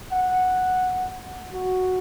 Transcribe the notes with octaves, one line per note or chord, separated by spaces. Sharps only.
F#5
F#4